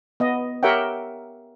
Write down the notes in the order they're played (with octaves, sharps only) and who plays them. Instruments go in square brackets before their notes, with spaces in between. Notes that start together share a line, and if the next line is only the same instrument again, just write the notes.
[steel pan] B3 D#5
G4 A#4 C#5 E5 F#5 G5